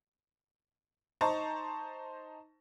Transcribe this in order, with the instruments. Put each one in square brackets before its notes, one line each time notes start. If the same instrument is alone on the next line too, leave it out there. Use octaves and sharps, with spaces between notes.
[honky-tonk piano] D#4 C5 A5 A#5 C#6